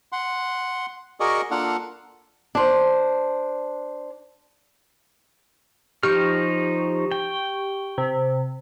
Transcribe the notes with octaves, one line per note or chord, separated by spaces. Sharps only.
F#5 C6
F#4 G#4 A#4 D5 D#5 C#6
A#3 D4 F4 A4 F5 F#5
D4 C5
F3 D#4 G4 C#6 F6
G5
C3